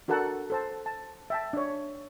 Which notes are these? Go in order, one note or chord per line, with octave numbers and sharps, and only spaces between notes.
D4 F#4 A4 A#4 F#5 A5
A4 C5 A5
A5
E5 G5 A5
D4 C#5